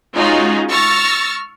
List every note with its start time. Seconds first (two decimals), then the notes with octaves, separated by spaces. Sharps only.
0.15 G#3 C#4 D#4 F4 F#4 G#4
0.70 C#6 E6 F6 A6 A#6